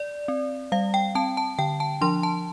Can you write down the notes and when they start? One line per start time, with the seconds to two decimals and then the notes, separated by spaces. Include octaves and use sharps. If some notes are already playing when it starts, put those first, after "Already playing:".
Already playing: D5
0.28 C4
0.72 G3 F5
0.94 G5
1.15 C4 A5
1.37 A5
1.59 D3 G5
1.80 A5
2.01 F3 D4 C6
2.23 A5